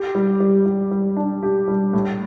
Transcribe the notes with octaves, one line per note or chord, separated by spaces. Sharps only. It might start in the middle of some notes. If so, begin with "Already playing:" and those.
Already playing: G4
G3
G3
G3
G3
D4
G4
G3
A2